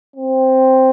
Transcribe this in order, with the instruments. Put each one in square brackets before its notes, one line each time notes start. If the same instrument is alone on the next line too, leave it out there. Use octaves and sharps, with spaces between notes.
[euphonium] C4